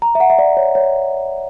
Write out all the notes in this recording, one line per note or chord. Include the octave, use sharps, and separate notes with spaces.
A#5
E5
F#5
E5
D5
C#5
C#5